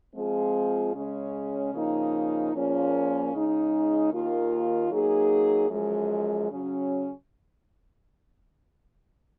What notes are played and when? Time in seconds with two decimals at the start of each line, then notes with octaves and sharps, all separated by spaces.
0.14 F3 G#3 C4 F4 G#4
0.94 C#3 G#3 C#4
1.73 C#3 F3 A#3 D#4
2.52 A#2 F3 A#3 C#4 G#4
3.32 C#3 G#3 D#4
4.11 D#2 D#3 A#3 F4 A#4
4.90 F#3 A#3 D#4 G#4
5.69 F#2 F3 G#3
6.49 C#3 F#3 C#4